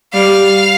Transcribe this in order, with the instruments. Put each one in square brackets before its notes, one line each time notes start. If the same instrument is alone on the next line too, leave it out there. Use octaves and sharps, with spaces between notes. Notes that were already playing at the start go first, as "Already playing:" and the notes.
[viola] G3 [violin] F5